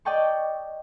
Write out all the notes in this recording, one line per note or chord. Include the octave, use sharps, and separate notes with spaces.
D5 D#5 G5 A5 C#6